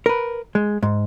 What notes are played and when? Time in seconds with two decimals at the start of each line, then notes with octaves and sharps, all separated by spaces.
0.06 A#4 B4
0.55 G#3
0.83 G#2